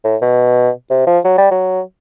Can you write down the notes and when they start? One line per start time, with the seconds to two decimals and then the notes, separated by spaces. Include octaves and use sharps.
0.04 A2
0.22 B2
0.90 C3
1.07 F3
1.25 F#3
1.38 G3
1.51 F#3